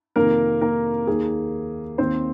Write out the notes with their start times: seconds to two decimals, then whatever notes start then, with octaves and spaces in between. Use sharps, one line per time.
0.16 F2 C3 D#3 A#3 A#4
0.61 A#3 A#4
1.07 D#2 D#3 A#3 G#4
1.98 D#2 D#3 A#3 C4 C5